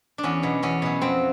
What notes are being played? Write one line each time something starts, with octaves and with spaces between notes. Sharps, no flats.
D4
E2 C#4
B2 F#3
E2 C#4
B2 F#3
F2 C4